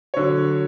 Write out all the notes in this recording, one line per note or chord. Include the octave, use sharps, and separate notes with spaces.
D3 F#3 C#5